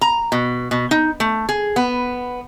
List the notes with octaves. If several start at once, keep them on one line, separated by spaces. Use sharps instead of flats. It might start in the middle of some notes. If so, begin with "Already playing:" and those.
A#5
B2
B2
D#4
A3
G#4
B3